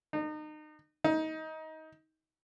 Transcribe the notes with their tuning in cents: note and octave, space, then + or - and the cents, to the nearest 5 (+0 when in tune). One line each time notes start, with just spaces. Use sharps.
D#4 -30
D#4 +25